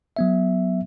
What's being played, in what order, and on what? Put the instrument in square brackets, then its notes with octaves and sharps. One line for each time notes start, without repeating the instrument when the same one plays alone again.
[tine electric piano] F#3 B3 E5